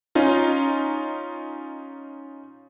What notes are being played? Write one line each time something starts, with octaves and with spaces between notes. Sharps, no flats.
C#4 D#4 F4